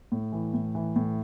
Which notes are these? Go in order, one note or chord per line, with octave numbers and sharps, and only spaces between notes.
A2
E3
A2
E3
A2